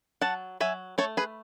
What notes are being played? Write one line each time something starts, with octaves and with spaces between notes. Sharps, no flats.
F#3 F#5 A5
F#3 E5 G#5
A3 A4 C#5
G#4 B4